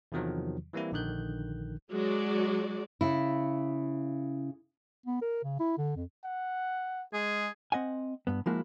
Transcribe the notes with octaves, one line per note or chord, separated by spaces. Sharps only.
E2 C3 D#3 F3 F#3
E3 G3 A#3 C4 E4
A#1 D3 D#3 F#6 G6
F#3 G#3 F#4 D5
C#3 E4
B3
A#4
C#3
E4
D3
F2
F#5
G#3 G#4
C4 D#5 F#5 G#5
G2 B3
F3 G#3 A#3 E4 F#4